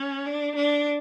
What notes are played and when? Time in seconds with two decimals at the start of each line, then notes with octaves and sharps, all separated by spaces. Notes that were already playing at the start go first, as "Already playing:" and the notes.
Already playing: C#4
0.26 D4
0.55 D4